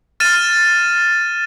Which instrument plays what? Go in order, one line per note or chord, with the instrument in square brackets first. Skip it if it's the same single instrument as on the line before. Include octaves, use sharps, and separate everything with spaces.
[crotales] F6 A6 D#7 E7